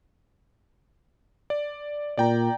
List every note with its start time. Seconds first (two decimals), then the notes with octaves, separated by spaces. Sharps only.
1.50 D5
2.17 A#2 D5 G5 A#5